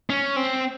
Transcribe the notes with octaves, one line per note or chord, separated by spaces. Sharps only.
C#4
C4